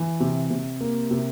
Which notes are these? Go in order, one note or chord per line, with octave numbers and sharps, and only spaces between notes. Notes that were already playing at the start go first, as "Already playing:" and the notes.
Already playing: E3
C3
C3
A#3
C3